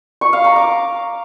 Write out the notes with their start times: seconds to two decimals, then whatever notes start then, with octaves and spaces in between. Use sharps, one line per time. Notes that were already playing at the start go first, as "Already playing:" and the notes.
0.21 C#6
0.33 F5
0.44 A#5
0.56 D6